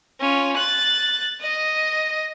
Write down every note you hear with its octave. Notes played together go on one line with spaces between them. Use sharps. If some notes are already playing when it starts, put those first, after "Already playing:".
C#4 F4
F#6 A6
D#5